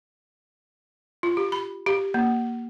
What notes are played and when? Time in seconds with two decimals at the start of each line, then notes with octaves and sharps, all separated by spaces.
1.23 F4
1.37 G4
1.52 B5
1.86 G4
2.14 A#3